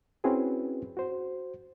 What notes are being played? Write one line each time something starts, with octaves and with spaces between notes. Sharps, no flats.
C4 C#4 E4 F#4 G#4 B4
F#4 C5